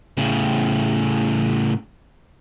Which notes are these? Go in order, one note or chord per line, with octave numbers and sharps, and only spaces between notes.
A2 C#3